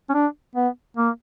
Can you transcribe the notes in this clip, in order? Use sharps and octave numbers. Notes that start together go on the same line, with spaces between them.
C#4
D4
B3
A#3